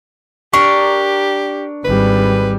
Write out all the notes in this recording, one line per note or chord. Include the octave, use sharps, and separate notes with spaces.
D4 G4 A#4 D5 C#6
G#1 G3 B4